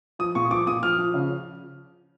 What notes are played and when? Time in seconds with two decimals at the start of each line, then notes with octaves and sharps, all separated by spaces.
0.19 F3 D#6
0.35 A#2 C#6
0.51 F3 D6
0.67 A#2 D#6
0.83 F3 F6
0.98 F3
1.14 C#3